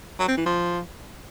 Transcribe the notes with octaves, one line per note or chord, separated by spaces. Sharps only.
F#3
C4
E3
F3